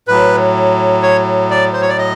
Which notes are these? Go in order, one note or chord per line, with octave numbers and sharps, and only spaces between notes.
A2 F#3 B4
C#5
D5
C5
C#5
D5
D#5